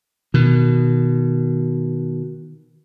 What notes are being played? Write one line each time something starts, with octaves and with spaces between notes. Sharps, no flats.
B2 D#3